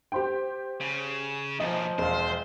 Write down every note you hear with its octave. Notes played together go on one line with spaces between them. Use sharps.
G4 C5 G5
C#3
B1 A#2 F3 D#5
E1 C5 F5